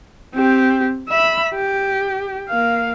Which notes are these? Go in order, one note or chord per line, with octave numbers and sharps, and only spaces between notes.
C4 G4
E5 B5
G4
A#3 F5